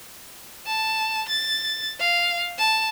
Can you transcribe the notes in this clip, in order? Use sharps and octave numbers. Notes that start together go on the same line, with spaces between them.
A5
A6
F5
A5